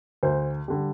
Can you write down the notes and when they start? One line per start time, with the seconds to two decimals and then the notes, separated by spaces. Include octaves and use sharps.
0.23 D2 C5
0.68 D3 G3